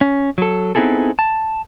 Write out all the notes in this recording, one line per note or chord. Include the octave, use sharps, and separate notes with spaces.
C#4
F#3 A4
B3 C4 D#4 E4 G#4 A4
A5